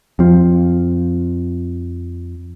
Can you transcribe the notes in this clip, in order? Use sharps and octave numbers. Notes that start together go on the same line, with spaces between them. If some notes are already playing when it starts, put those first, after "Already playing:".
F2 F3